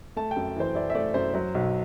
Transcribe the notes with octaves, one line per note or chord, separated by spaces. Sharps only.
A3 A5
G5
F#2
E3 C5
E4 D5
E5
A3 D5
F#2 C5
F#3 C5
B1